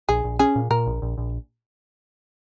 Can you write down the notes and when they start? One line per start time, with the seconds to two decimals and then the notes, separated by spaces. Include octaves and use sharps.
0.09 A#1 G#4
0.24 A#1
0.39 C#4 G#4
0.56 A#2
0.70 A#2 A#4
0.86 A#1
1.02 A#1
1.18 A#1